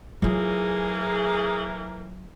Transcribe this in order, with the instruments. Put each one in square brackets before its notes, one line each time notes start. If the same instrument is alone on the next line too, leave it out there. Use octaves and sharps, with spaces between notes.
[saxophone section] A2 E3 A#3 [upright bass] F#3 F4 [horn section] G#4